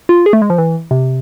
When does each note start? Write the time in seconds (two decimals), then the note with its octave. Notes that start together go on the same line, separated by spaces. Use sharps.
0.09 F4
0.26 G#4
0.33 A3
0.42 G#3
0.50 F3
0.58 E3
0.91 C3